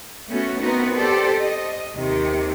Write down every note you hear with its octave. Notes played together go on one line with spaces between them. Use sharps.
A3 B3 C#4 F#4
B3 C4 D#4 F#4 A#4 B4
G4 A4 C5 D5
D#5
D#2 C3 D#3